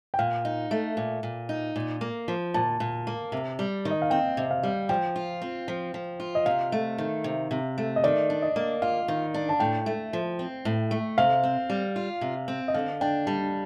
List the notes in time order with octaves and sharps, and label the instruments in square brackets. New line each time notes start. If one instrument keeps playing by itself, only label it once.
[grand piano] G5
[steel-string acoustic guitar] A#2 [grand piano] F5
[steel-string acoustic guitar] D#4
A3
A#2
A#2
D#4
A#2
A#3
F3
[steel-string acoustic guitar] A#2 [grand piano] A5
[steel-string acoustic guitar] A#2
A#3
C3
G3
D#3
[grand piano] D#5
F5
[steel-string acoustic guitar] C4 [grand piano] G5
[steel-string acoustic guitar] C3
[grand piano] F5
[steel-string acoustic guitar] G3
[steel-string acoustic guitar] F3 [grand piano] G5
[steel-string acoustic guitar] F4
C4
F3
F3
F4
[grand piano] D#5
[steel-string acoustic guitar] C3 [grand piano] F5
[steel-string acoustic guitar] A3
D#3
C3
C3
A3
[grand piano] D#5
[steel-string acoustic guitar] D#3 [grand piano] D5
[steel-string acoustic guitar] D4
[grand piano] D#5
[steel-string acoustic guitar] A#3
[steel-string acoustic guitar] F4 [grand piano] F5
[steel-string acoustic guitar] D#3
D4
[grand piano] A5
[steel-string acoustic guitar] A2 [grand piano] G5
[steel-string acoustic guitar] A3
F3
C4
A2
A3
[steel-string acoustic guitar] C3 [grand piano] F5
[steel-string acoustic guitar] C4
G3
F4
C3
C4
[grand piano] D#5
[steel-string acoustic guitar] D3 [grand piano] F5
[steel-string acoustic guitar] D4 [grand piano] G5
[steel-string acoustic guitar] G3 [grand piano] A5